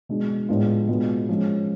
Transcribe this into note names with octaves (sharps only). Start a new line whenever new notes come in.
B2 G#3 D4
A2 G#3 B3 D4 F4
B2 G#3 B3 D4 F4
F3 G#3 C#4